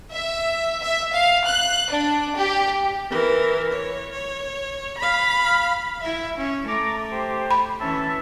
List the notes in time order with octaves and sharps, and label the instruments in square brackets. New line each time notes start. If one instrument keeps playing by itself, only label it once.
[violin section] E5
E5
F5
F#6
D4
G4
[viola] E3 A#4
C#5
C#5
F5 B5
[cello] E4 E5
C#4
[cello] A3 [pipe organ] A#5 D6
[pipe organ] G4 C5
[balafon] B5
[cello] E3 C#4 [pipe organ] E5 A5